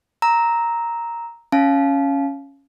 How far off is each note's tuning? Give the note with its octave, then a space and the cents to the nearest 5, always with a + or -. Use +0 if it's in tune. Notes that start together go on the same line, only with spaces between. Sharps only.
A#5 +0 E6 -25
C#4 +0 F5 -10 A5 -40